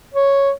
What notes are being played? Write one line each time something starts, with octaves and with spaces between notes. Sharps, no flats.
C#5